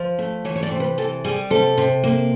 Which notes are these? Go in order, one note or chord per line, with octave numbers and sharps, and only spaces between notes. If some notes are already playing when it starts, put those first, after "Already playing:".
Already playing: F3
A3
E3 C#5
C#5
D5
C3
B4
E3 A4
G3 G#4
C3 A4
C3
A#3